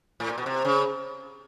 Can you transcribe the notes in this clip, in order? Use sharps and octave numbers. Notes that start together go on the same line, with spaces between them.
A2
A#2
B2
C3
C#3